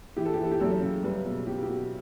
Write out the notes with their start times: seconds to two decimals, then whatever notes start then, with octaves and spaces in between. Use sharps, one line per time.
0.17 E3 G4
0.25 A4
0.34 G4
0.39 E3 A4
0.51 G4
0.60 F#2 A4
0.82 C#3
1.03 G3 B4
1.25 B2
1.46 B2 G4
1.62 G4
1.68 B2 F#4